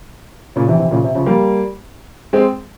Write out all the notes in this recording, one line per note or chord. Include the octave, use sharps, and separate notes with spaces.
A#2 C#3
C3 E3
C3 E3
A#2 C#3
C3
C#3 F3
G3 A#3
G#3 C4